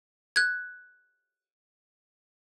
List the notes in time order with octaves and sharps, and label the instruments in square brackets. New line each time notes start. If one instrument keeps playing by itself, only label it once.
[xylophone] F#6 G#6